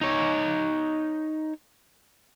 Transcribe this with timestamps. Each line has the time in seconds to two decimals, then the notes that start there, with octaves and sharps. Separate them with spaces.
0.01 D#4 C#5